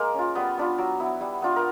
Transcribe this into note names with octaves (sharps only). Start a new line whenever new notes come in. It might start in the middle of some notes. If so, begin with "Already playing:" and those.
Already playing: G#3 A#3 A#4
C#4 F4
G3 B3 B4
B3 D4 F4
F#3
B3 E4
G3
B3 D4 F4
A#4